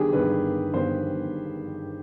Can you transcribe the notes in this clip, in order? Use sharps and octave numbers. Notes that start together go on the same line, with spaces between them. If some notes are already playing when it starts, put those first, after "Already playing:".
Already playing: G1 G2 D#3 D4 G4 G#4
G1 G2 D#3 B4
G1 G2 D#3 C5